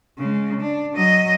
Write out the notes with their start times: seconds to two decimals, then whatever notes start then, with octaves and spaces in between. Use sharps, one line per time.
0.19 C#3 G#3
0.61 D4
0.94 F#3 D#5